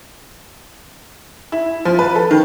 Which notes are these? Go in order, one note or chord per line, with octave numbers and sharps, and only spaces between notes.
E4
F3
B4
A4
D#3